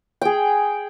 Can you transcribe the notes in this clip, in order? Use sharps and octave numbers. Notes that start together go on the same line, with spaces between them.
G#4 G5